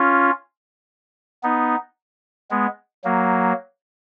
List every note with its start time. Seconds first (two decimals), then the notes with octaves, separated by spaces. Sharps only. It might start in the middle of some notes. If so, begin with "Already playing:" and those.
Already playing: C#4 F4
1.43 B3 D#4
2.51 G#3 B3
3.04 F#3 A#3